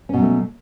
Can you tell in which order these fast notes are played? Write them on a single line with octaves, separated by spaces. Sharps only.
C#4 B2 F#3 A3